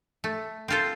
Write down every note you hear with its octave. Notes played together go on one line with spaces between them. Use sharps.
A3
C4 F4 A4 C5